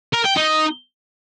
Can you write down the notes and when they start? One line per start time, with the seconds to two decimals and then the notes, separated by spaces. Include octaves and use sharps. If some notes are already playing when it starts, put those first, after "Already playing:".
0.13 A#4
0.24 G5
0.36 D#4